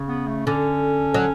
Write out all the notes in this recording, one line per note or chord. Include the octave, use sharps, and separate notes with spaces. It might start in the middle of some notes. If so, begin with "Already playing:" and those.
Already playing: C#3
B3
A3
D3 C#4
F#3